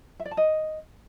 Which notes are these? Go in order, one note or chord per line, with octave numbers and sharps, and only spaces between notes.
E5
D5
A5
D#5